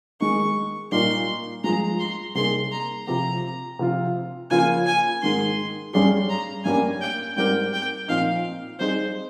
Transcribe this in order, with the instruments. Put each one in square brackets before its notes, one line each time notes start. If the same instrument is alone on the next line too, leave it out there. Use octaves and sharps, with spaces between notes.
[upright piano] D#3 G#3 D#4 [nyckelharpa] C#6
[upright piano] A#2 G3 A#3 D#4 A#4 [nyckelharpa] C6
[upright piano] G2 F3 G#3 [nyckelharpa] A#5
[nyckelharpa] C6
[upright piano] C3 G3 A#3 D#4 G#4 [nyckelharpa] C6
[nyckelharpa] A#5
[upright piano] C3 F3 C4 G4 [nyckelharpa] A#5
[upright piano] C3 F3 C4 F4
[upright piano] C#3 F3 A#3 F4 A#4 [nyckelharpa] G#5
[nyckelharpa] G#5
[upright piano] G#2 D#3 G#3 [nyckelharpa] C6
[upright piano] G2 G3 C#4 G#4 [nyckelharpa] C6
[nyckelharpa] A#5
[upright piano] G2 G3 A#3 C#4 G4 [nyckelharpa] G#5
[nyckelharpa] G5
[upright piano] G#2 G3 C4 G4 A#4 [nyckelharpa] G5
[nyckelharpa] G5
[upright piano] A#2 F3 C4 D#4 [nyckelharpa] F5
[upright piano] G3 C4 D#4 G#4 [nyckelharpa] C5